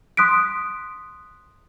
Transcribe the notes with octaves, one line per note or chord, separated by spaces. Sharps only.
C6 D#6 F#6 B6 D7